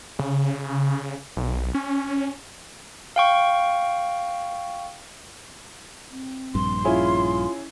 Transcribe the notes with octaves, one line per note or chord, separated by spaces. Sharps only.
C#3
B1
C#4
F5 G5 C#6
C4
A#1 G2 C6
C#4 E4 F4 G#4